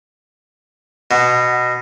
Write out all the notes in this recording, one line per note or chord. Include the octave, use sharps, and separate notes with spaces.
B2